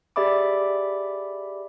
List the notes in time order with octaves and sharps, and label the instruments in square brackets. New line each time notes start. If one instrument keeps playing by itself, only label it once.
[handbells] G4 G#4 D5 E5 B5 D6